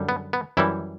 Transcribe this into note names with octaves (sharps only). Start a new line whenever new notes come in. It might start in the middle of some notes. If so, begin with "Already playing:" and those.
Already playing: F#2 D3 G3
B3
B3
F#2 E3 G3 E4